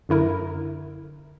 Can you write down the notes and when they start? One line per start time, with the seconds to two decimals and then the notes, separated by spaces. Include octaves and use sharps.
0.09 F#2 D3 E4 A#4